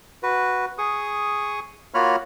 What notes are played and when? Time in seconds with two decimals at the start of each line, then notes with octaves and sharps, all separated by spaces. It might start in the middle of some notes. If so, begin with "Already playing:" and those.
0.23 F#4 B4
0.78 G#4 C#6 D#6
1.94 A#3 F4 F#4 C#5 B5 F6